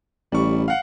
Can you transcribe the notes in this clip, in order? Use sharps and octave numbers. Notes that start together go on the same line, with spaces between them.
A1 G3 C#6
F5 F#5